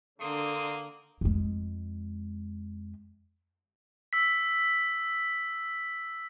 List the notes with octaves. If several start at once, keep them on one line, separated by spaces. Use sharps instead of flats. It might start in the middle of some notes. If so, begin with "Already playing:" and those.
D3 A#3 C4 C6 D#6
F2 G#3
E6 B6